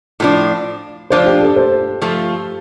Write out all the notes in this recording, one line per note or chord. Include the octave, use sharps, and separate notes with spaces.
A2 F3 D4 F4
F3 D4 F4 C5
G4
A4
C5
F3 A3 F4